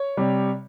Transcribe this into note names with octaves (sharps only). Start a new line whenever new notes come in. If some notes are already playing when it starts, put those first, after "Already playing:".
Already playing: C#5
C3 G3